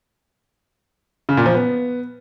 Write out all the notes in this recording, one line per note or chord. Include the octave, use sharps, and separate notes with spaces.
C#3
A#2
F3
B3